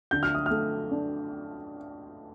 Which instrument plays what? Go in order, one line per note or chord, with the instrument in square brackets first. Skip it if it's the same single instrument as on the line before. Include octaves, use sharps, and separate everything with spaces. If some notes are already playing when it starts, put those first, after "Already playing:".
[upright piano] D3 [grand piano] G6
[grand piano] F6
D#6
[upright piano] A3 [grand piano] F6
[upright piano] D4